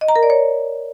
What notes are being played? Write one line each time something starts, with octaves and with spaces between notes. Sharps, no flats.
D#5
A#5
A#4
D5
C#5